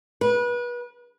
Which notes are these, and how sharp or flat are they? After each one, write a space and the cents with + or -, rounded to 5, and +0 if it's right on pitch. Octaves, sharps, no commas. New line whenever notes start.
B4 -30